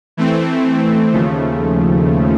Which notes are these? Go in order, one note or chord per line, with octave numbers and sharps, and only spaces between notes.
E3 A3 C4
D#2 C#3 F3 A3